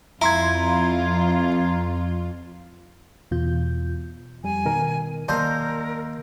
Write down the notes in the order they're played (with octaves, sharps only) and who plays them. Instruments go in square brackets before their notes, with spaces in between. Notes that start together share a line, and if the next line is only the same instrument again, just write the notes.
[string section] F2 F4 [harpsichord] E4 [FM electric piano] A#5 C6 G#6
[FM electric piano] E2 B2 F4 G6
[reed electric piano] F2 G3 [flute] G#5
[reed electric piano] B2 D#3 A#4
[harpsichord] D#2 C5 A#5 [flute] A#4 [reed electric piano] D5 A5